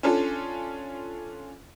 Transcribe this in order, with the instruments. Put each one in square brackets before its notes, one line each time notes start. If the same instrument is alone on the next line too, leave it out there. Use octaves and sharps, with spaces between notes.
[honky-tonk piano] C#4 D4 F4 A4